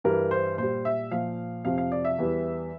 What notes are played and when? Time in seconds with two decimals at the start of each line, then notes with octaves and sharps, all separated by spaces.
0.04 G2 E3 G3 A#4
0.31 C5
0.58 A#2 G3 C5
0.85 E5
1.11 A#2 F3 F5
1.65 F2 C3 F3 F5
1.78 F5
1.92 D5
2.05 E5
2.18 E2 E3 G3